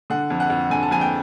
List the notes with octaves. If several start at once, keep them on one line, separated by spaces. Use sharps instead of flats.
D3 F#5
F2
F#5
F2
D3 G#5
A5
F2 G#5
G5